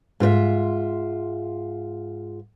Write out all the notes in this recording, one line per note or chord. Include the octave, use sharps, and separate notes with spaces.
G#2 F4 B4 E5